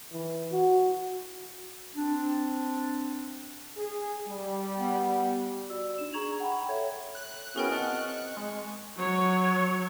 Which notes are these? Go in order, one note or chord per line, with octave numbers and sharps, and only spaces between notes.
E3
F#4
C4 D4
G#4
G3
B3
F#4 D5 E6
D4 D#4 E7
G#4 A#5 C#6 G#6 F7 F#7
F#5 G5 A#5 B5
A4 C#5 E5 G#6
F#6
B3 C#4 E4 F#4 G#4 A#4 G5
C4 D#5 F#5 A5 F6
C#6
G#3
F#3 C#5